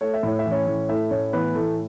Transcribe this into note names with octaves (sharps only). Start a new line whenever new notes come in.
A3 C#5
E5
A2 C#5
E5
E3
C#4 C#5
A2
A3 E4 E5
A2 C#4 C#5
E3 B3 B4
A2 A3 A4